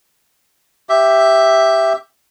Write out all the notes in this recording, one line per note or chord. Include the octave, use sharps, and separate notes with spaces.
G4 E5